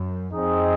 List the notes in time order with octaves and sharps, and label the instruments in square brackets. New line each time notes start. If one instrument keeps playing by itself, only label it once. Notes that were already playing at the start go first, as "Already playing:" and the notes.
Already playing: [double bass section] F#2
[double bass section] F2 [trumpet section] C4 D#4 G#4 D#5